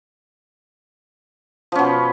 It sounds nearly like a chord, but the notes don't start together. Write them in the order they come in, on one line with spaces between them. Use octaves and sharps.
F3 C#4 B2